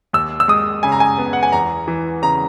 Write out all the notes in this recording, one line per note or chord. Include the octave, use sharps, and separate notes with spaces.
D#2 E6
E6
G#3 D#6
C#3 G#5
A#5
G#5
B3
F#5
G#5
E2 A#5
E3
C#3 A#5